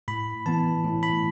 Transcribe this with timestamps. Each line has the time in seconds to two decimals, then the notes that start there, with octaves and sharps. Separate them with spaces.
0.08 A2 B5
0.46 E3 B3 A5
0.84 A2
1.03 B5